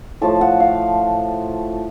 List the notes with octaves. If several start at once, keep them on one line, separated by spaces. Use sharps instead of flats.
A2 F3 A3 A5
F#5
F5